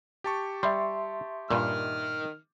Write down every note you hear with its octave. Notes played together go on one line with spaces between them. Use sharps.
G4 A5 C#6
G3 E5 C6
G2 A#2 D#3 F6